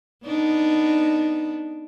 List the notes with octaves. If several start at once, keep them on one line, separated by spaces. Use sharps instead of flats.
B3 D4 D#4